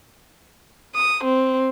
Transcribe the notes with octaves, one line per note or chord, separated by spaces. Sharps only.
D#6
C4